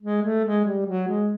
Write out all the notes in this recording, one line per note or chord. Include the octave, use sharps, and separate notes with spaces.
G#3
A3
G#3
G3
F#3
G#3